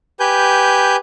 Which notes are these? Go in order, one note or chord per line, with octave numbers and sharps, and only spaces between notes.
G4 B4 G#5 G6